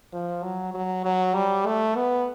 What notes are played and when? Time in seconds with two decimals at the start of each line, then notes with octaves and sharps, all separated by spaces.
0.13 F3
0.43 F#3
0.74 F#3
1.05 F#3
1.35 G3
1.66 A3
1.96 B3